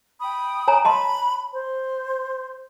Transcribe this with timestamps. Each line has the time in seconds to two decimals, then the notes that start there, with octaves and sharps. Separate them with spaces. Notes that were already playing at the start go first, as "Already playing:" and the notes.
0.21 G5 B5 D#6
0.68 C#5 G#5 A#5
0.85 D#5 A5 B5 C6
1.53 C5